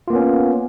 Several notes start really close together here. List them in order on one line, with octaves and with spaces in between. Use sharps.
F4 A#3 B3 C#4